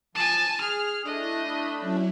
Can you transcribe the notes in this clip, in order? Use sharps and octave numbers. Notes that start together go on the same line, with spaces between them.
F3 G#5 A5
G#4 F6
A3 D4 E4 D#5
B5
F#3 C#4 E4